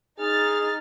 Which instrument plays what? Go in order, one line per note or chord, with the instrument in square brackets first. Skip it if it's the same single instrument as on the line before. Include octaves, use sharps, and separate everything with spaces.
[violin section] D#4 F6 A6 [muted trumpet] G#4